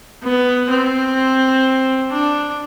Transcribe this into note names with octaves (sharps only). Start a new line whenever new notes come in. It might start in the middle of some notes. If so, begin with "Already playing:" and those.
B3
C4
D4